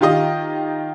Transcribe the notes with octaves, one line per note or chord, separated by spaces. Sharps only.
D#3 F4 G4 D#5